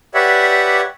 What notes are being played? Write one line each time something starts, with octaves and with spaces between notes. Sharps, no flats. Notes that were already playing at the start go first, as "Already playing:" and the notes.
G4 B4 C#5 D5 E5 F#5